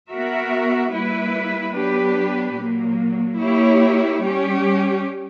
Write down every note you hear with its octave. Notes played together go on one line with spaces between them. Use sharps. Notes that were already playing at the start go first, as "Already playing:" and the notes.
B3 F#4 A#4 E5
G3 A#3 E4 B4
F#3 B3 D4 G4 B4
A#2 F#3 A#3
A#3 E4 G4 C#5
G3 C#4 G4